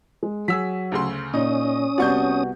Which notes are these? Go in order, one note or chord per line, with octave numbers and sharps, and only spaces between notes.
G#3
F#3 G#4 E6 B6
D2 C#3 C6
A#2 C#4 D#4 D#6
C2 B3 F#4 D5 C#6 G6